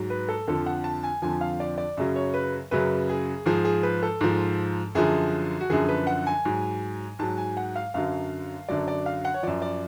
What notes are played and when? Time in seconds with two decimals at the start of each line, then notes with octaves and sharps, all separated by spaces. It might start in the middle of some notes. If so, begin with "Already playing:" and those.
Already playing: G#2 F#3
0.10 B4
0.29 A4
0.47 F2 D3 F3 A4
0.66 F#5
0.84 A5
1.03 G#5
1.22 F2 D3 F3 G#5
1.41 F5
1.60 D5
1.78 D5
1.97 F#2 C#3 F#3
2.16 C#5
2.34 B4
2.71 F#2 C#3 F#3 B4
3.09 G#4
3.45 G#2 F3 G#4
3.65 G#4
3.83 B4
4.03 A4
4.21 G#2 F3
4.95 F#2 D3 F3 G#4
5.61 F#4
5.70 F#2 D3 F3 G#4
5.89 B4
6.07 F#5
6.27 G#5
6.45 G#2 F#3
7.19 G#2 F#3 A5
7.38 G#5
7.57 F#5
7.76 F5
7.94 F#2 D3 F#3 F5
8.69 F#2 D3 F#3 D5
8.88 D5
9.06 F5
9.25 F#5
9.34 C#5
9.43 F#2 F3 D5
9.62 D5